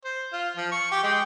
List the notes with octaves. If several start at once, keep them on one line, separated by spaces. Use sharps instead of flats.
C5
F4
F3
C#6
G4
G#3 G5